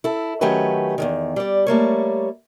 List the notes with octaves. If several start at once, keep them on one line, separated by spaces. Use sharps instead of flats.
E4 A4
D#3 F#3 A3 C#4 G4 B4
E2 A#2 D#3
G3 D5
G3 A3 A#3 C#5